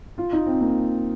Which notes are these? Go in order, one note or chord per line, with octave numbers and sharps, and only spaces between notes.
F4
D#4
C4
A#3